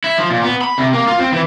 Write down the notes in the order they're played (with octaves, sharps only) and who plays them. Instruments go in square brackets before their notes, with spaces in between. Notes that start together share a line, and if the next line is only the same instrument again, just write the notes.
[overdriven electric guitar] E4
F3
A#2
B3
B5
C3
A#3
F4
C4
E3